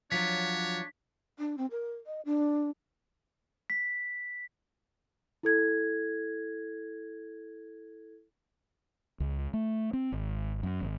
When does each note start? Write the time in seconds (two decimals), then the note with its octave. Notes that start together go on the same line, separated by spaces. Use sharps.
0.12 F3 F#3 D4 C#5 B6
1.39 D4
1.58 C4
1.71 A#4
2.06 D#5
2.25 D4
3.70 B6
5.43 E4 A4 G#6
9.20 C#2
9.53 A3
9.93 C4
10.12 G#1
10.63 F#2
10.81 G#1